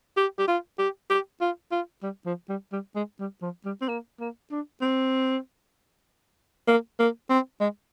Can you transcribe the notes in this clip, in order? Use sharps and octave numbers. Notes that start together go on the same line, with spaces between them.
G4
G4
F4
G4
G4
F4
F4
G3
F3
G3
G3
G#3
G3
F3
G3
C4
A#3
A#3
D4
C4
A#3
A#3
C4
G#3